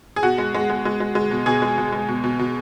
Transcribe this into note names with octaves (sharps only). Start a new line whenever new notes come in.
G#4
B2 F#4
G#3
G#3
G#3
G#3
G#3
G#3
B2
B2 G#4
G#3
B2
G#3
B2
B2
B2